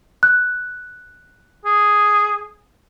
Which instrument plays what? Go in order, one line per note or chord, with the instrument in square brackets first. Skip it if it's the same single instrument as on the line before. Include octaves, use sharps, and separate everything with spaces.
[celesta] F#6
[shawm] G#4